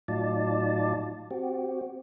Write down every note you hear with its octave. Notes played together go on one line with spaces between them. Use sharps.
A2 F#3 D#4 F4 D5 A5
C4 F#4 G4